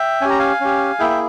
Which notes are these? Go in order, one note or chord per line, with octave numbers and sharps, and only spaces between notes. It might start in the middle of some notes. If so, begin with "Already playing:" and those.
Already playing: E5 G5
C#4 G4 G#5
A#5
F5 G#5
C#4 G4
A#3 E4 G#4 E5 G5
E5